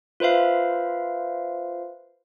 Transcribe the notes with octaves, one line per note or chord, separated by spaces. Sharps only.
F4 B4 C5 E5 F5